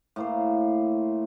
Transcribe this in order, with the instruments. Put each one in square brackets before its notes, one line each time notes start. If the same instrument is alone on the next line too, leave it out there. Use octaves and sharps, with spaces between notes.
[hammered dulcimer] A2 A#3 C5